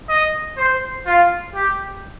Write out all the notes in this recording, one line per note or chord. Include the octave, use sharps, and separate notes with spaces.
D#5
C5
F4
G4